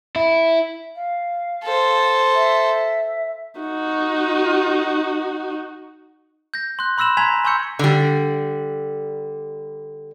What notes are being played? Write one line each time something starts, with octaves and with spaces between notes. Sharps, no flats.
E4
F5
A4 C5
E5
D#4 F#4
G6 A#6
C6 F#6
B5 C6 E6 A#6 E7 F#7
G#5 A#5 C6 G#6 B6 F7
G#5 C6 C#6 E6 G6 C#7
D3 G3